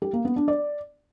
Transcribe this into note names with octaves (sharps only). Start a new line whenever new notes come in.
G4
A#3
B3
D4
D5